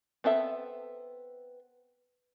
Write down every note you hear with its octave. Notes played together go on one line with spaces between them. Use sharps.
B3 C4 A4 E5